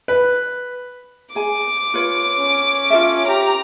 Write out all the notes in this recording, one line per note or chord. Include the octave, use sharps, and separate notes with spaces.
B4
G#4 G#5 D6
F4 B4 C#5
C#4
F4 A4 E5
G4 A#5